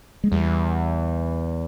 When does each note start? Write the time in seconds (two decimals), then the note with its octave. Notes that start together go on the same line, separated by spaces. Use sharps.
0.24 G#3
0.32 E2 G3